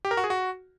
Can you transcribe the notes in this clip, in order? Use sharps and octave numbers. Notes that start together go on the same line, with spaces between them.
G4
A#4
F#4
G#4
F#4